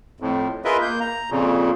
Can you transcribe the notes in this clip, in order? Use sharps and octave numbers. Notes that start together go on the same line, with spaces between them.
F2 A2
F4 G#4 A#4 B4 D#5 E5
A#3 G6
A#5
F2 A#2 C#3